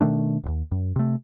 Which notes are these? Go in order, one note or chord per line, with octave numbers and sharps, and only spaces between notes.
B2 D#3 A3 D4
D1 D#2
F#2
C3 A3